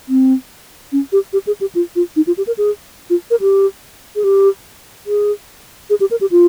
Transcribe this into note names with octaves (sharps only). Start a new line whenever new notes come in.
C4
C#4
G4
G4
G#4
G4
F4
F4
D#4
F4
G4
A#4
G#4
F4
A#4
G4
G#4
G4
G#4
G#4
G4
A#4
G4
F4